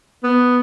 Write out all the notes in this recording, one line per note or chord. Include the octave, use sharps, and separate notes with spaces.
B3